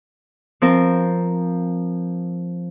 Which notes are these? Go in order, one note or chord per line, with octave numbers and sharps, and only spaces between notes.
F3 C4 A#4